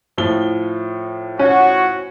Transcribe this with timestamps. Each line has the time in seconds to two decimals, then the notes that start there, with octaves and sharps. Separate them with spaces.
0.18 A2 F3 G7
1.39 C#4 F#4